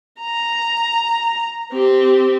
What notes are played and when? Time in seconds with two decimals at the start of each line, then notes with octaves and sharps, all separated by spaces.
0.21 A#5
1.72 C4 G4